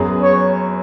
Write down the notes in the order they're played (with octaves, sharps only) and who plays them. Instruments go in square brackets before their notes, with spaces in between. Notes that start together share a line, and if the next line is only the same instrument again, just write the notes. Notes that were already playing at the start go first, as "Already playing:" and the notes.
Already playing: [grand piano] F#2 F#3 B3 G#4 B4
[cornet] C#5